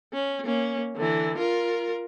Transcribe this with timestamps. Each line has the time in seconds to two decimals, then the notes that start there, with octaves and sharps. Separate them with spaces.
0.13 C#4
0.44 A#3 C#4
0.96 D3 E3
1.38 F4 A#4